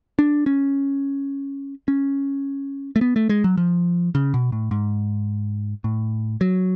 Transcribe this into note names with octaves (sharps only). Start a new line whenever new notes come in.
D4
C#4
C#4
A3
B3
A3
G#3
F#3
F3
C#3
B2
A2
G#2
A2
F#3